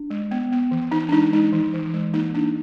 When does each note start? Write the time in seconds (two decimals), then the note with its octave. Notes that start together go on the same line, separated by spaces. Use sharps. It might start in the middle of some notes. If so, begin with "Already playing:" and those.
Already playing: D4
0.10 G#3
0.31 B3
0.52 B3
0.71 E3
0.92 E3 D#4
1.09 D4
1.12 G#3 D#4
1.33 G#3 D#4
1.53 E3
1.74 E3
1.94 G#3
2.14 A#3 D#4
2.34 D4